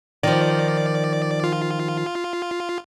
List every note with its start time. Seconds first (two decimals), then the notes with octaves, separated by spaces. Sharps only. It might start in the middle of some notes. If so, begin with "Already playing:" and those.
0.23 D#3 F3 D5
1.44 F4